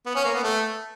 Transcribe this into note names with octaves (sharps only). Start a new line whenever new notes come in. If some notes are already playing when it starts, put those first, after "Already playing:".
B3
C#4
A#3
B3
A3